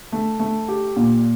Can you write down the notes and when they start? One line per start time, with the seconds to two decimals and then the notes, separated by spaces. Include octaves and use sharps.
0.12 A3
0.39 A3
0.68 G4
0.96 A#2